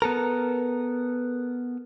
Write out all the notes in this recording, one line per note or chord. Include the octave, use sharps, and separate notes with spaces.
B3 A4 A#4